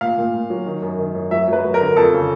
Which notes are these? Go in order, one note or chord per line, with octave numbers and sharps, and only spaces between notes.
A#2 F5
A#2
A#2
F#3
D#3
F#2
D#3
F#2
F#3 E5
F#3 B4
F#3
A#4
D3
F2 A4
C#3